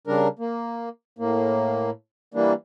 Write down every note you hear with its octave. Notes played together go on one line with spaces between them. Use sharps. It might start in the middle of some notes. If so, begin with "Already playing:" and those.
C#3 G3 D4 A#4
A#3
A2 A#3
E3 G3 A#3 D4